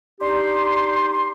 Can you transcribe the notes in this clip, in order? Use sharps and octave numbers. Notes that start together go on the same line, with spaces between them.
D4 D#4 G4 C6